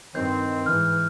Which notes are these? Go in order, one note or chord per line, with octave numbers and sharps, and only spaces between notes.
G2 D#3 C4 G6
G#2 E3 F6